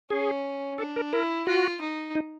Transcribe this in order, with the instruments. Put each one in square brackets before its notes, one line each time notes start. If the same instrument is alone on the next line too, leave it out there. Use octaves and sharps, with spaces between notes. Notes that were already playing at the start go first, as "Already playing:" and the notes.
[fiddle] C#4 [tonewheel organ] G#4
[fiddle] D4 [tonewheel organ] A4
[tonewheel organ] A#4
[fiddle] E4 [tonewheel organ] A#4
[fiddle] F4 [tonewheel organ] F#4
[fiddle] D#4
[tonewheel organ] D#4